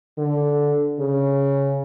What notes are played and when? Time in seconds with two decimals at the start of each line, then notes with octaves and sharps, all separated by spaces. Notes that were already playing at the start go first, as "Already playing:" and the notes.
0.18 D3
0.99 C#3